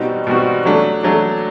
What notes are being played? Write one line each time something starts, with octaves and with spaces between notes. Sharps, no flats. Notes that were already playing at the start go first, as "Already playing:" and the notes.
Already playing: B2 G3 C4 D#4 F#4
B2 G3 C4 D#4 F#4
F#3 A3 D4
F#3 A3 D4